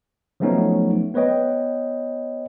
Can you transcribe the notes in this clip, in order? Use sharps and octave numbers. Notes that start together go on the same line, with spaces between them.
F3 F#3 A3 B3 C#4 D#4
B3 B4 C#5 D#5 G5